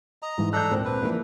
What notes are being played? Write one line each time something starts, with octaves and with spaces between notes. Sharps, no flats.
D#5 A#5
G#2 E3 G#3
D4 A4 A#5 F#6 G6
D2 A#2 C4
B4
E3 F3 A#3 D4